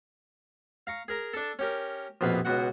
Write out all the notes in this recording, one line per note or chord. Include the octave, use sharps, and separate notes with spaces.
F5 A#5 C#6
G#4 A#4 A#5
D4 A4
C#4 G4 A#4
A#1 F2 B2 B4 F5 B5
C#2 B2 F#4 F#5